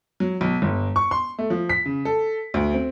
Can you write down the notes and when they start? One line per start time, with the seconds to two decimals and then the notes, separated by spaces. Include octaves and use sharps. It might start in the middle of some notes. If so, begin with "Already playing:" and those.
0.20 F#3
0.41 B1
0.62 G1
0.96 C#6
1.11 C6
1.39 A3
1.50 F3
1.69 B6
1.86 C#3
2.05 A4
2.54 D2
2.74 C4